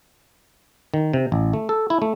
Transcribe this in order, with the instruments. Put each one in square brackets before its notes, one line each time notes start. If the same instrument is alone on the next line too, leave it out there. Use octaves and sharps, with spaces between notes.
[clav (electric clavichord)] D#3
C3
A1
A3
A4
E4
A3